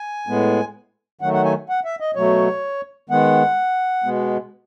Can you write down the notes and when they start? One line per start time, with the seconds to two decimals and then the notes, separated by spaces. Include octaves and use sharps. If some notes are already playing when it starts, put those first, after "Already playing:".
Already playing: G#5
0.27 A2 G#3 B3
1.21 D#3 F#3 A3 F#5
1.33 F#5
1.44 G#5
1.69 F#5
1.85 E5
2.00 D#5
2.15 B2 F#3 A3 C#5
3.10 D#3 G#3 B3 F#5
4.04 B2 G#3 B3